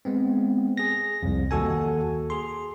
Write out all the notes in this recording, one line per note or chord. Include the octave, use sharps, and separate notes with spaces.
G#3 B3 C4
G#4 A#6
C2 F2
D#2 F#4 A4 G#5
G#4 C6